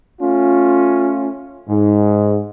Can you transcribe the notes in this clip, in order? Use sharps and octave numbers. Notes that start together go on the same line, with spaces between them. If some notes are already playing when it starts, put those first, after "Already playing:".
A3 C#4 F4
G#2